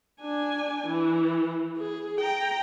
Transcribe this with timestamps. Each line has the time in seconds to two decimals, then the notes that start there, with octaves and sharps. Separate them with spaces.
0.22 D4 G#5
0.87 E3
1.78 G#4
2.20 G5 A#5